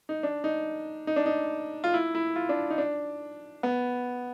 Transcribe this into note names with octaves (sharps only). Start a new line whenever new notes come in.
D#4
D4
D#4
D#4
D4
D#4
F4
E4
E4
F4
D4
D#4
D4
B3